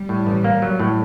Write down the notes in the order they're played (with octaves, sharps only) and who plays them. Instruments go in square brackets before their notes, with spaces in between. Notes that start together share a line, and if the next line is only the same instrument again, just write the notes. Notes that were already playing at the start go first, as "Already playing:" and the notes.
Already playing: [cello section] G3
[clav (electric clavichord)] A2
A1
A#3
F#3
A2